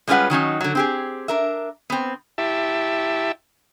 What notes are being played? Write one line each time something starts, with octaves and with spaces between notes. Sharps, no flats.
G3 G#3 C#4 F4 B4 F#5
D#3 F#3 C#4 D#4
D3 F#3
C4 G4 G#4
D4 A#4 E5
B3 C4
E4 G4 E5 A5